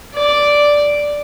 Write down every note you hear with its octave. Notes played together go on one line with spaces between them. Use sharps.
D5